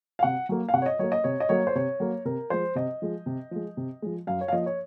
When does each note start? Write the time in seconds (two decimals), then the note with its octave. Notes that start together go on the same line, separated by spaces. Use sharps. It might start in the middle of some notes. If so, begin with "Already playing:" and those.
0.19 F5
0.23 C3 F#5
0.49 F#3 A#3
0.69 F5
0.74 C3 F#5
0.82 C#5
0.86 D#5
0.99 F#3 A#3 C#5
1.12 D#5
1.24 C3 C#5
1.40 D#5
1.49 F#3 A#3 C#5
1.67 C5
1.75 C3 C#5
2.00 F#3 A#3
2.25 C3 A#4
2.50 F3 G#3 C5
2.75 C3 D#5
3.02 F3 G#3
3.26 C3
3.51 F3 G#3
3.77 C3
4.02 F3 G#3
4.27 F#2 F5
4.41 C#5
4.48 F5
4.52 F3 A#3 D#5
4.66 C#5